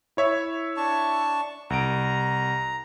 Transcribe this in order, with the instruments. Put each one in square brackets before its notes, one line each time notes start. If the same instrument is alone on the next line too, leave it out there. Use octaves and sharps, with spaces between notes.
[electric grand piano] E4 C#5 E5
[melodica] D4 A5 C#6
[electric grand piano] C2 D7 [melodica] A#5